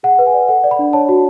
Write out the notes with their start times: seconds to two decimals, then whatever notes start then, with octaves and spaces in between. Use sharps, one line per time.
0.03 G#4 F#5
0.19 B4
0.27 G#5
0.34 D5
0.48 A4 F#5
0.64 D5
0.71 B5
0.79 D4
0.93 C#5 A5
1.09 F#4